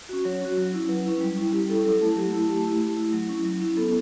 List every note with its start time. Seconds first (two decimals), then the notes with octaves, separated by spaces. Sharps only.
0.09 C#4 F#4
0.25 F#3 C#5
0.41 C#4 F#4
0.57 F#3
0.73 C#4 E4
0.89 F#3 B4
1.06 C#4 E4
1.21 G3
1.37 C#4 E4
1.52 G3 G4
1.69 C#4 E4 A4
1.85 F#3 A4
2.01 A3 E4
2.16 F#3 G4
2.33 A3 E4
2.49 A3 G4
2.65 E4
2.80 A3
2.97 E4
3.13 F#3
3.29 C#4 E4
3.45 F#3
3.61 C#4 E4
3.77 B3 A4